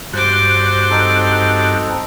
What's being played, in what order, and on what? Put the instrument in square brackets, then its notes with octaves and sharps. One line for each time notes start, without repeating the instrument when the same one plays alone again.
[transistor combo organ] G2 F#4 [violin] C5 D6
[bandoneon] C4 D#4 A4